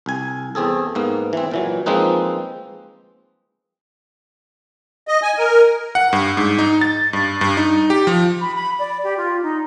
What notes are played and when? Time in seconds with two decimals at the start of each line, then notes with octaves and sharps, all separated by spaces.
0.06 C2 G#5
0.55 E2 C4 G#4 A4
0.95 G#2 A#3 B3
1.33 E3 C4
1.51 A#2 E3 F#3
1.86 F3 G#3 A#3 C4 D#4 B4
5.08 D#5
5.23 G#5
5.38 A#4
5.95 F#5
6.13 G2
6.37 G#2
6.59 D#4
6.81 A6
7.13 G2
7.41 G2
7.57 D#4
7.90 G4
8.07 F3
8.41 B5
8.55 B5
8.79 D5
9.04 G4
9.17 F4
9.43 D#4